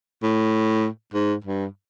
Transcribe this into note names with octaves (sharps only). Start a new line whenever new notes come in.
A2
G#2
G2